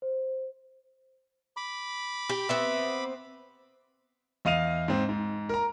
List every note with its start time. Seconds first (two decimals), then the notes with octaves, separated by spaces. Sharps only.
0.02 C5
1.57 B5 D6
2.29 G4
2.49 B3 C4 E5
4.45 E2 D#5 F5 D#7 F7
4.88 G#2 C4
5.09 G#2
5.49 A#4 A#5